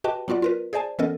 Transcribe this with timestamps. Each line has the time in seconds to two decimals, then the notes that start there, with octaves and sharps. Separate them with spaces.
0.04 F#4 G4 B4 D#5 G5 A5
0.28 F#3 B3 F4 F#4 D5
0.42 F4 A#4 B4
0.73 G#4 C5 D5 G#5 A5
0.99 E3 B3 C#4 A4 A#4 D#5